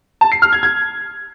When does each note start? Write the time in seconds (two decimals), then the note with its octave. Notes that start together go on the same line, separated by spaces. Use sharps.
0.21 A5
0.32 C7
0.42 F6
0.53 G#6
0.63 G#6